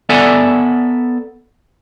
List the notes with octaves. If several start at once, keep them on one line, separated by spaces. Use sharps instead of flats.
B3 A4 D5 E5 F#5 G#5